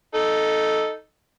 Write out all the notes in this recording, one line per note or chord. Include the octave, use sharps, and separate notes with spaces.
D#4 A4